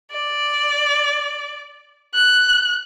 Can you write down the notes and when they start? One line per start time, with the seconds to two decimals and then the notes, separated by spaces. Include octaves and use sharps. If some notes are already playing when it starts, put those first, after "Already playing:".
0.12 D5
2.14 F#6